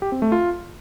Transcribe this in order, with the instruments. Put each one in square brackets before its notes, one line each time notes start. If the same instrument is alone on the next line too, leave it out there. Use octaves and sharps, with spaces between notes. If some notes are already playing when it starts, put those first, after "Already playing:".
[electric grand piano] G4
C4
A3
F4